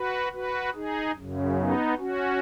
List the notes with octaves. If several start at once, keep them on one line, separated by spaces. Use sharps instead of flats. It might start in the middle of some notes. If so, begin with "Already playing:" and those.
Already playing: F#4 B4
F#4 B4
D#4 G#4
F#2 C#3
B3 D#4
C#4 F#4